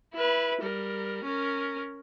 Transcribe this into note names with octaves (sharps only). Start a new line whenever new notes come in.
E4 B4
G3 A#4
C#4 A#4